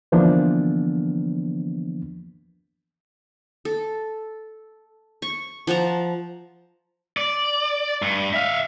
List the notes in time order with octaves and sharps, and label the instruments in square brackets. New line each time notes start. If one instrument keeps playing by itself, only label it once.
[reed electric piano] D3 E3 F3 A#3 B3 D4
[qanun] A4
C#6
F3 F#5 A5 A#5
[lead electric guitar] D5
G2
E5 F5